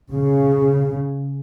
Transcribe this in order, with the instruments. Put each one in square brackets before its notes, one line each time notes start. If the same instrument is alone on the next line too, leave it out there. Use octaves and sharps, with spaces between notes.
[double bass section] C#3